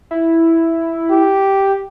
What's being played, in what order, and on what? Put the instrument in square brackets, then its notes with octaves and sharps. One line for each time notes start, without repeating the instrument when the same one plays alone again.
[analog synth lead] E4
[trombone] G4